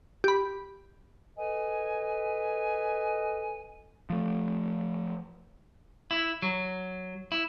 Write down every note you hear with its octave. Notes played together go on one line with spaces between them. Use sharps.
G4 B5
A4 B4 D#5 G#5
F3 A3
E4
F#3
E4